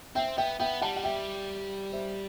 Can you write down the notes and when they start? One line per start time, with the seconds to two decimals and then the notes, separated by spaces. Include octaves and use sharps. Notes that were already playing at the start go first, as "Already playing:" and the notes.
0.15 C4 E5 G5
0.37 B3 E5 G5
0.60 B3 E5 G5
0.81 G3 F#5 A5
0.96 F#5
1.04 E5 G5
1.92 C5 E5